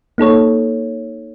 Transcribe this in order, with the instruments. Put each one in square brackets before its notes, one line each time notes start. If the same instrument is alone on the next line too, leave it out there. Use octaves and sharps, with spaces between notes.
[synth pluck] A#3 D#4 A4 C#5